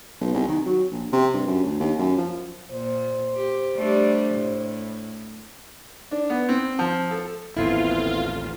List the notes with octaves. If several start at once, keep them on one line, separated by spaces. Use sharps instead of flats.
B1
C2
D#3
F#3
A#1
C3
G2
F#2
D2
D#2
F#2
F3
A#2 C5
G4
G3 A3 D4
A2
D4
B3
C4
F3
A4
A1 D#2 B3 C4 E4 F4 A4